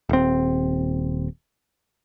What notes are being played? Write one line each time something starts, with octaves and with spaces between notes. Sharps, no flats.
D#1 C4